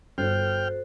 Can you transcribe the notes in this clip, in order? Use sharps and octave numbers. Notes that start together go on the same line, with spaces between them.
G1 F#4 A4 C5 G5 F6